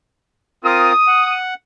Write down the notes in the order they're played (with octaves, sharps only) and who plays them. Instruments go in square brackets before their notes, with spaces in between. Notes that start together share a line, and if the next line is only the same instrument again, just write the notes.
[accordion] C4 F4 A#4 [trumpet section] D#6
[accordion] F#5